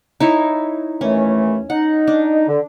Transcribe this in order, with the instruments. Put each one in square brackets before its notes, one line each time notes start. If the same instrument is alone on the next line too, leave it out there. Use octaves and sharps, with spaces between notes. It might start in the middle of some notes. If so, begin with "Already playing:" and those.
[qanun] D#4 E4 C#5
[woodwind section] D#2 E3 A3 [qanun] C#4
[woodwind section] D#4 [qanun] F#5
[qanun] D4
[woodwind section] D3